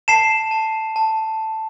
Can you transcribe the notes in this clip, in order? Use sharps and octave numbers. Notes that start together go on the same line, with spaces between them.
A5 C7 E7
A5
A5